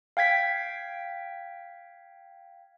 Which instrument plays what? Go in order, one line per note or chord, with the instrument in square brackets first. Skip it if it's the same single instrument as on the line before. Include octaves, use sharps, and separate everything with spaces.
[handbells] F5 G5 G#6 B6